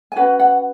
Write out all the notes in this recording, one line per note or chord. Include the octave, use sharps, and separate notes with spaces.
G#5
C#4 F#4 B4 F#5
F#5